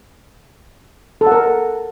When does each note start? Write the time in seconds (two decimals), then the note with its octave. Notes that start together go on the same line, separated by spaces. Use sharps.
1.21 A4
1.26 F#5
1.32 A#4